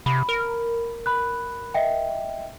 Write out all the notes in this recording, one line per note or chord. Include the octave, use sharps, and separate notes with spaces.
C3 B5
A#4
B5 F#6
D#5 E5 G5